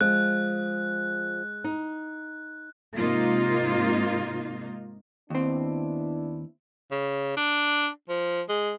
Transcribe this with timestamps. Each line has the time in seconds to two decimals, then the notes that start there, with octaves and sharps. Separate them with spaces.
0.01 F3 G#3 F#6
1.64 D#4
2.97 G#2 C3 A#3 D#4 F4
5.30 D#2 B3 C4 D4 E4
6.91 C#3
7.37 D4
8.09 F3
8.49 G#3